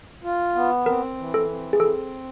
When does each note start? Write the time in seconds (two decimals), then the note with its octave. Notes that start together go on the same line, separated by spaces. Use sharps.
0.23 F4
0.55 B3
0.86 C4 A#4
1.17 E3
1.34 A4
1.49 C4
1.73 G#4
1.80 C4 A4